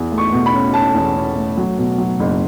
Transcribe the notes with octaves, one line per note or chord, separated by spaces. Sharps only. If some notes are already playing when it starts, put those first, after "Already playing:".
Already playing: E2
A3
C#6
B2
B5
C#4
C#4 A5
E2
C#4
A3
F#3
B2
F#3
F#1